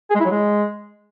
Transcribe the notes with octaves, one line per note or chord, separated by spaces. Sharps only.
G#4
G#3
E4
F#3
G#3